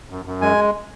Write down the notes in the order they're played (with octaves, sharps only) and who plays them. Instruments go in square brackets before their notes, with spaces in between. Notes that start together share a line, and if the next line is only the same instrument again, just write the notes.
[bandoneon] F#2
F#2
G#3 G#5